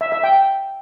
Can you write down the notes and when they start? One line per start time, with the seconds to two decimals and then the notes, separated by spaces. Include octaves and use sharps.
0.01 E5
0.12 E5
0.23 G5